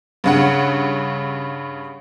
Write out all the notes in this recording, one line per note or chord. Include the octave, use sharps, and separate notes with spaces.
G2 C#3 F#5